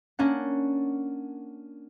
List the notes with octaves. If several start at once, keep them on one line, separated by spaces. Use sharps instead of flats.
A#3 C#4 D4 F#5